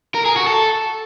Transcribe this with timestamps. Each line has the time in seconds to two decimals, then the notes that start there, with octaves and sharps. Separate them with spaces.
0.15 A#4
0.25 G#4
0.36 F#4
0.47 A4